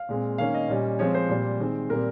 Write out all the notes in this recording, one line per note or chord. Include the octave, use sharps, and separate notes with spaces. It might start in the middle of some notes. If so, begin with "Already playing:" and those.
Already playing: F5
A#2 G#3 C4
D#3 A#3 C#4 F5
D#5
A#2 G3 C#4
F3 G#3 C4 C#5
C5
A#2 G3 C4
D#3 G#3 C4
A#2 G3 C4 A#4